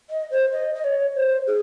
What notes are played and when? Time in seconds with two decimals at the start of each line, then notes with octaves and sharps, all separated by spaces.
0.10 D#5
0.31 C5
0.52 D#5
0.75 D#5
0.84 C#5
1.16 C5
1.47 G#4